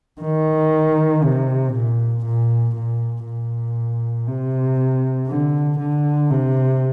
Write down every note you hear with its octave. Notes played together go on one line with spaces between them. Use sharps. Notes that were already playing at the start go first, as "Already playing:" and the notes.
D#3
C3
A#2
A#2
A#2
A#2
C3
D3
D3
C3